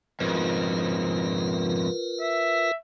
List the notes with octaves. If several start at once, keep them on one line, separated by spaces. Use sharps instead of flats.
F2 G#2 F4 A#4 B4
E5